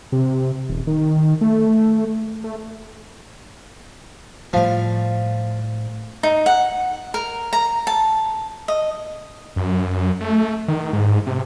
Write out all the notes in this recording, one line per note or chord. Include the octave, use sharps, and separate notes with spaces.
C3
D#1
D#3
A3
A3
A2 F3 G3
D#4
F#5
A#4
A#5
A5
D#5
F#2
A3
D#3
G#2
C3